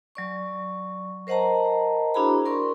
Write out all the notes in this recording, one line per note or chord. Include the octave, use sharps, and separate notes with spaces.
F#3 D5 C#6
A#4 C5 D#5 F#5 A5 A#5
D4 E4 F#4 G#4 A#5 B5
A#4 D5 C6 C#6